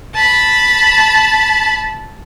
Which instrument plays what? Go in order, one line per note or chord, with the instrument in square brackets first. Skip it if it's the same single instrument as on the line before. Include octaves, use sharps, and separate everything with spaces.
[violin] A5 B5